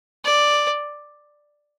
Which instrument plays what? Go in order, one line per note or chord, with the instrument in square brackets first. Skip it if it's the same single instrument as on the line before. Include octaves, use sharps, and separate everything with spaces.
[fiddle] D5